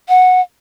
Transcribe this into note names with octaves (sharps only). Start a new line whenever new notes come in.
F#5